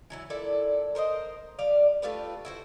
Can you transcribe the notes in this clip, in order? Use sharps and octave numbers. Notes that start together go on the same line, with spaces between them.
E3 F#3 E4
A#2 E4 A4 D5
A#4 C5 D5 D#5
G3 D5 F5
A3 F4 G4 B4
E4 F#4 C5